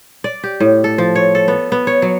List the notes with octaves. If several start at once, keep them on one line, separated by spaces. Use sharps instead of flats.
D5
G4
A2
A4
F3
C#5
A4
B3
B3
C#5
F#3